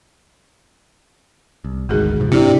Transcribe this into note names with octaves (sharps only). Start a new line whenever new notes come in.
C2
G#1 D2 D#3 G#3 F#4 G#4
G#2 C3 F3
G#2 C3 C4 D4 E4 G4 D5